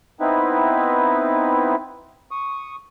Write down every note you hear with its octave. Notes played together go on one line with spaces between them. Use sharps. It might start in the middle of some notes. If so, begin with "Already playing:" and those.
B3 C4 D#4 E4 B4
C#6 D#6